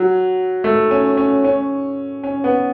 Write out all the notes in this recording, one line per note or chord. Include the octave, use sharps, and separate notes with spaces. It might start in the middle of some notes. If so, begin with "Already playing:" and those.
Already playing: F#3
A3
C#4
C#4
C#4
C#4
B3